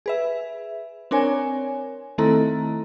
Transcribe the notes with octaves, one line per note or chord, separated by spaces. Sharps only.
G#4 B4 E5
C4 D4 A#4 C#5 G#5
D#3 A3 C4 E4 A4 A#5